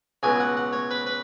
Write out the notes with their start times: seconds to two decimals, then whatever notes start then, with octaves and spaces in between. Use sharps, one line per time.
0.23 C#2 B2 F#3 G#5
0.40 F#5
0.57 F#5
0.73 C#5
0.91 B4
1.06 B4